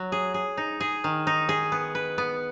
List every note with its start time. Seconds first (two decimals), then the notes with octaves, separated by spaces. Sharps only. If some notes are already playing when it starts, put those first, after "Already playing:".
Already playing: F#3
0.12 G#4
0.34 G#4
0.57 D#4
0.80 G#4
1.04 D#3
1.27 D#4
1.49 G#4
1.72 B3
1.95 B4
2.18 B3